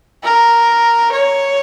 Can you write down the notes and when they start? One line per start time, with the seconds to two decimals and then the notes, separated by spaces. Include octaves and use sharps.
0.24 A#4
1.12 C#5